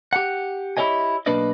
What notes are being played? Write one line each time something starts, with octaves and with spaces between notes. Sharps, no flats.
G4 F#5
E4 G4 C#5 D#5 G#5
B1 A#3 D4 B4 D5 D#5